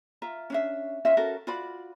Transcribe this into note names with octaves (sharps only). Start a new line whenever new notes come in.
F4 E5 A#5
C#4 D4 E5
C#4 F4 D#5 E5
C#4 F#4 A4 A#4
F4 F#4 D5 B5